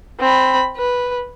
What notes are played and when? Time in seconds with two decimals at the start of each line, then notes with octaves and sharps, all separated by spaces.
0.20 C4 B5
0.77 B4